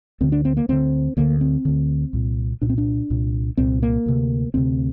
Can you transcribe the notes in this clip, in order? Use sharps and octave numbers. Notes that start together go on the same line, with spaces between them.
D2 D3 C4
D4
C4
A#3
D2 D3 C4
D2 D3 A#3
C4
D2 D3
C2 A#2
C2 A#2 D4
C4
D4
C2 A#2
C2 A#2 C4
A#3
D2 C3
D2 C3 C4